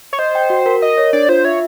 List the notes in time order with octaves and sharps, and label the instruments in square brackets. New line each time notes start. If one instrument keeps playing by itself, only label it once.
[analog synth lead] C#5
[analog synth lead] C5 [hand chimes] D#5
[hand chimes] G5
F#4
A#4
[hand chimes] A#4 [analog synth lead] D#5
[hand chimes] C#5
[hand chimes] D4 [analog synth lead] D5
[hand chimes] F4 [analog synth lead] C5
[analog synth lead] C#5 [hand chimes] E5